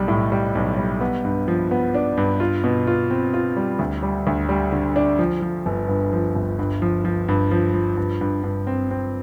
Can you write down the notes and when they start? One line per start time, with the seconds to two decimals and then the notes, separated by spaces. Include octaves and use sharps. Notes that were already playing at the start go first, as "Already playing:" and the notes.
Already playing: B1 G3
0.08 A2
0.32 G3
0.55 B1
0.78 G3
1.01 B3
1.25 G2
1.48 F3
1.71 B3
1.94 D4
2.17 G2
2.40 F4
2.64 B2
2.87 F4
3.11 C4
3.34 F4
3.57 G3
3.79 D2
4.03 G3
4.27 D2
4.49 G3
4.72 D3
4.96 D4
5.19 F3
5.42 F3
5.66 G1
5.88 G2
6.12 F3
6.36 G1
6.59 G2
6.82 F3
7.05 F3
7.28 G2
7.51 F3
7.74 F3
7.97 G2
8.21 G2
8.43 G2
8.67 C4
8.91 C4